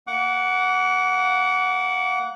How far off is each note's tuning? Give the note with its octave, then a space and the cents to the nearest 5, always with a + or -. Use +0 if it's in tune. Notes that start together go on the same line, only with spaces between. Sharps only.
A#3 +0 F#5 +0 D6 -35